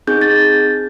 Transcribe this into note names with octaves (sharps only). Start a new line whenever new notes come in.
C4 D#4 G#4 G6
A6